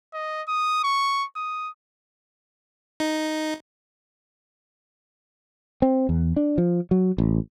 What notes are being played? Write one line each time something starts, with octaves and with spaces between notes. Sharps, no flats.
D#5
D#6
C#6
D#6
D#4
C4
E2
D4
F3
F#3
A1